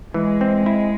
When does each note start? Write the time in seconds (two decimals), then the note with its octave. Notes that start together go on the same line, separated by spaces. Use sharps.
0.14 E3 G#3
0.41 C4
0.66 E4